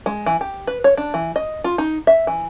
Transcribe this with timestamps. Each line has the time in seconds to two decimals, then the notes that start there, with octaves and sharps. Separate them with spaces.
0.06 G#3
0.26 E3
0.41 G4
0.67 B4
0.84 C#5
0.97 D4
1.14 E3
1.36 D#5
1.64 F4
1.78 D#4
2.07 E5
2.27 E3